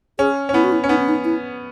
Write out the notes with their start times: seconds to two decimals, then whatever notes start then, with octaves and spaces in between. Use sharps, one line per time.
0.19 C#4 G#4
0.49 C#4
0.54 B3 E4
0.64 F#4
0.72 E4
0.84 C#4
0.89 B3 D#4
0.98 C#4
1.09 D#4
1.24 E4